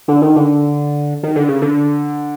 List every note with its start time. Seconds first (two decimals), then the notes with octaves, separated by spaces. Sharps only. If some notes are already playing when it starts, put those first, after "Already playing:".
0.08 D3
0.22 D#3
0.36 D3
1.23 D#3
1.36 D3
1.48 C#3
1.62 D3